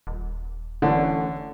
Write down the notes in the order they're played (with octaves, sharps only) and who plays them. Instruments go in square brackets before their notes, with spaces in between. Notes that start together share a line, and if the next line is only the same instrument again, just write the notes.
[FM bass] D#1
[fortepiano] D3 [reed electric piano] E3 A3 C#4